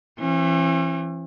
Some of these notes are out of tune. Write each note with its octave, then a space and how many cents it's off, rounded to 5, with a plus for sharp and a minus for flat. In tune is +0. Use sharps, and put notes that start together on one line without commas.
E3 +30 C#4 -45